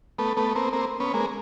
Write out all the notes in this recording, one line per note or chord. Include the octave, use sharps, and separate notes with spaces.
A3 B3
A3 B3
A#3 C4
A#3 C4
B3 C#4
G#3 A#3